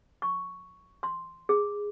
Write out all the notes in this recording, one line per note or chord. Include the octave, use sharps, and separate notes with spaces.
C#6
C6
G#4